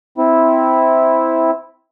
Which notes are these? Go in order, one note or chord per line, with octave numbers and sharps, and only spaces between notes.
C4 E4